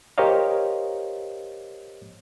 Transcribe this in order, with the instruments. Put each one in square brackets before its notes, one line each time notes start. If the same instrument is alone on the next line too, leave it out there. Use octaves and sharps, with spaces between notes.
[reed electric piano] G4 A#4 C5 C#5 D#5 F5